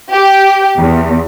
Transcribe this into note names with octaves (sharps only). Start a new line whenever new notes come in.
G4
E2